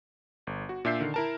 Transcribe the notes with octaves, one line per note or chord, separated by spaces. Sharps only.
G1
F#4
A#2 D4 E5 G6 C7
D3 D#3
E4 A#4 A5